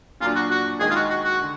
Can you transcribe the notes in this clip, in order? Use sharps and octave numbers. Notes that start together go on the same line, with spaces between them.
A#2 F#3 D4 F4
F#4
F#4
D#3 G#3 D#4 G#4
F4
F#4
F#4
F#4
D3